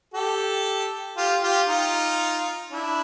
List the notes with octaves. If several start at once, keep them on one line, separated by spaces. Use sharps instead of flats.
G4 A4
F4 G4
F4 G4
D#4 F4
D4 E4